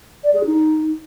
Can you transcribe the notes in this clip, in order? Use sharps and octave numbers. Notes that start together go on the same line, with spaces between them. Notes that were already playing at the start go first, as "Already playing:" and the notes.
D5
G#4
D#4